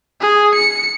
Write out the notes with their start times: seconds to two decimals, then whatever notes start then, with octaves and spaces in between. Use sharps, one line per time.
0.21 G#4
0.55 C#7